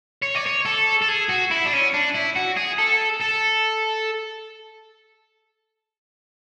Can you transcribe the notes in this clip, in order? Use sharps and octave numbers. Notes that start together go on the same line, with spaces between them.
C#5
D5
C#5
A4
A4
G#4
F#4
E4
D4
C#4
D4
E4
F#4
G#4
A4
A4